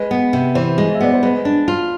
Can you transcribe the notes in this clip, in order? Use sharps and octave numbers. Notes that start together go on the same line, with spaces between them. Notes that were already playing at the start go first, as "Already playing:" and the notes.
Already playing: G#3 B4
B3
C3
E3 C5
G#3
E5
B3 D5
C5
G#3 B4
D4
F4